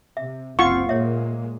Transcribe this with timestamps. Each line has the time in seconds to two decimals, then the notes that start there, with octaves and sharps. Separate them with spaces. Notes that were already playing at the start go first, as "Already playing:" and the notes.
0.17 C3 E5
0.59 F#1 C2 C4 F4 F#5 C#6
0.89 A#2 G#3 A#3 C#5 E5